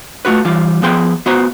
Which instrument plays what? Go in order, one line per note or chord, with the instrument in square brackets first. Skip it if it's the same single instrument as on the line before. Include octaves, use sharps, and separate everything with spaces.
[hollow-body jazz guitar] A3 F4 F#4 B4
E3 G3 F4
F3 B3 G#4 G5 C6
B3 F4 F#4 C5 G#5 A#5